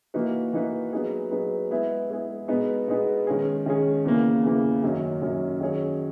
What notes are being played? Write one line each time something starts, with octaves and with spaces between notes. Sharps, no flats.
E3 A#3 D#4 F#4 B4
E3 A#3 D#4 F#4 B4
F#3 B3 D#4 G#4 B4
F#3 B3 D#4 G#4 B4
G#3 B3 E4 G#4
G#3 B3 E4 G#4
B2 G#3 B3 D#4 G#4
B2 G#3 B3 D#4 G#4
D#3 G#3 C#4 G#4
D#3 G#3 C#4 G#4
E2 C#3 E3 A#3
E2 C#3 E3 A#3
F#2 D#3 F#3 C#4
F#2 D#3 F#3 C#4
D#3 F#3 C#4 G#4 C#5